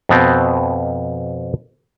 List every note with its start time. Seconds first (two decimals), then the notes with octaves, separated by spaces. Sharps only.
0.09 F2 B2 B3 C4